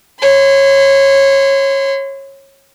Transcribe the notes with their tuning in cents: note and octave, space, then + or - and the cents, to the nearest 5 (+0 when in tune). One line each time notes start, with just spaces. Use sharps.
C#5 -20 C6 -40